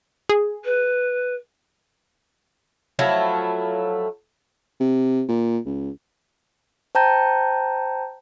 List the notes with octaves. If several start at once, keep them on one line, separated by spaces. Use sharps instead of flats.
G#4
B4
F3 F#3 A3 E4
C3
A#2
C#2
C5 G5 A5 A#5 G6